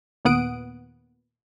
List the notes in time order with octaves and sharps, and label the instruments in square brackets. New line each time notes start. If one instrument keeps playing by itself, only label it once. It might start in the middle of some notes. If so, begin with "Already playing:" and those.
[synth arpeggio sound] D#2 A#2 B3 F#5 D#6 D7